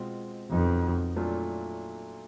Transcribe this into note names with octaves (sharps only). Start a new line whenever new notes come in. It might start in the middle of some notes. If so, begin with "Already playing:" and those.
Already playing: B2 G#3 C4 F4
F2 B2 F#3 B3 D#4
A#2 F#3 A3 D4 F4